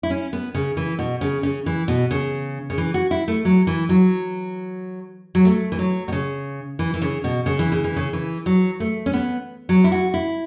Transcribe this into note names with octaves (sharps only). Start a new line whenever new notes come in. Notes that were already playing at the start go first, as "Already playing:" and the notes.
E4
C#4
B3
C#3
E3
B2
C#3
C#3
E3
B2
C#3
C#3
E3
F#4
E4
A3
F#3
E3
F#3
F#3
A3
E3
F#3
B2
C#3
E3
E3
C#3
B2
C#3
E3
C#3
E3
C#3
E3
F#3
A3
C#4
B3
F#3
E4
F#4
E4